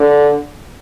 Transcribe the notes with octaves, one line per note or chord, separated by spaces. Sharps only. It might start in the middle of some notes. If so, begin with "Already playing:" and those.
Already playing: D3